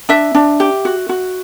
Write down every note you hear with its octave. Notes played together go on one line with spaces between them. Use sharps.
D4 E5
D4
G4
F#4
F#4